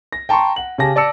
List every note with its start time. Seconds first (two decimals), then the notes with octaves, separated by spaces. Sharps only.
0.13 A#6
0.29 G5 A5 A#5 C6 C#6
0.56 F#5 F#7
0.78 C#3 G4 G#5 A5 A#6
0.96 D5 A5 E6 C#7